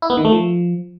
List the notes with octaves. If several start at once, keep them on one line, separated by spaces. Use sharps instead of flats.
E4
B3
D#3
A3
F3